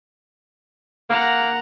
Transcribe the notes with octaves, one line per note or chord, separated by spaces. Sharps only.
A#3 F#5 A#5